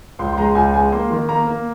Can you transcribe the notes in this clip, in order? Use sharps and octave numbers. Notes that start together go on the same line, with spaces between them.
C#2 C6
C6
G#3 A#5
C#2 G#5
G#3 G#5
A#3 C6
D#3
A#3 A#5
A#3